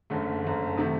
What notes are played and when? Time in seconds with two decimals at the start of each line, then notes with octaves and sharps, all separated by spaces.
0.10 F#1 F#2 D3 A3
0.44 F#1 F#2 D3 A3
0.77 C3 D#3 F#3 A3